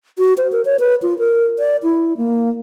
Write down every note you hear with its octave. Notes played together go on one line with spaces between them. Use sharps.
F#4
C5
A#4
C#5
B4
F4
A#4
D5
E4
A#3